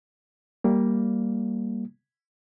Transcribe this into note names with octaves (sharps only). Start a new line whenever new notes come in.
G3 A#3